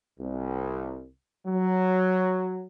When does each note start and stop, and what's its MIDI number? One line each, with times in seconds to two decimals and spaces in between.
0.19 1.06 36
1.46 2.67 54